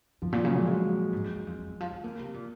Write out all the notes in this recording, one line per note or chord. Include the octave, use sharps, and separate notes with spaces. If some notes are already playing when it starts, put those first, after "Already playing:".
F#2 F3
A#2 F3
C#3 F#3
A#2 G#3
G#3
G#2
F#2
F#2
F2
F2
D#3
F3
D#3
C#3 A#3
C3
A#2